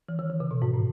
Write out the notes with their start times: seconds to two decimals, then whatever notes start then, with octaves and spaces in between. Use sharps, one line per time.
0.09 E3
0.19 D#3
0.30 D#3
0.40 C#3
0.51 B2
0.62 G#2
0.74 A2